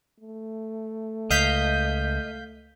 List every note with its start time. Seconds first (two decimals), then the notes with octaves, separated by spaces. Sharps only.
0.20 A3
1.31 C#2 D#5 F5 G6 B6